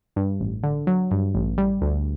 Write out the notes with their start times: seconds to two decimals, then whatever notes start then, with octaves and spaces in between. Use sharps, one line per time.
0.16 G2
0.40 A1
0.64 D3
0.87 F#3
1.11 G2
1.35 A1
1.58 G3
1.82 D2